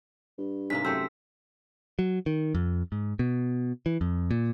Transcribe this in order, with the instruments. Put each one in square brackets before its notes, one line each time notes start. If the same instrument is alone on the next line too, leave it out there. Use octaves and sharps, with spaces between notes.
[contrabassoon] G2
[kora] G#2 C3 A#3 [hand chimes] B6
[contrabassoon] F#2 [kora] A3 C4 C5 [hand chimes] E6
[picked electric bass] F#3
D#3
F2
G#2
B2
E3
F2
A#2